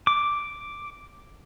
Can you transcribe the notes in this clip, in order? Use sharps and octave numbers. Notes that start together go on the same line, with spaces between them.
D6